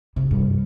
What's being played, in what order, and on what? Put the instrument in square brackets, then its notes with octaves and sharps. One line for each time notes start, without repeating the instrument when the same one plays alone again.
[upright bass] C3
G2